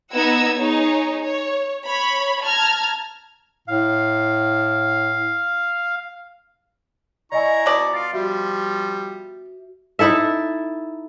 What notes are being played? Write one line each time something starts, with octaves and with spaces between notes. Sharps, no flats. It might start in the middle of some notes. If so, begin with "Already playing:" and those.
B3 D#4 F#5 E6 G#6
D#4 G#4 C#5
C#5
C#5 B5
A5 A#5 F6 G#6
A2 F5
E4 D5 D#5 G#5 A#5 C#6
B2 D5 D6 D#6
F4 A6 C7 D7
F3 G3 F#4 E5
D#4 E4 A4 E5